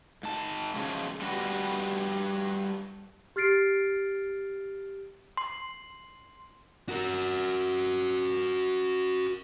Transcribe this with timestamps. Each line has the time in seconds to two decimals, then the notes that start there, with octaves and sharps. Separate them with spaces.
0.23 G#2 A5
0.76 C#3 F3 F#3 G#3
1.21 G3 D4 F#4 B4
3.36 G4 F6 A6 C7 D7
5.37 C6
6.89 F#4 A#4